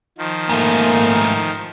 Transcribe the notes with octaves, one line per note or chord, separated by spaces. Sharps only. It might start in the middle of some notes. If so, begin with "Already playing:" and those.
D#3 F3
G#2 A3 A#3